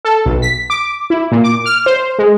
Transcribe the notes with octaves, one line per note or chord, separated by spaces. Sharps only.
A4
B1
B6
D6
E4
A#2
D6
F6
C5
G#3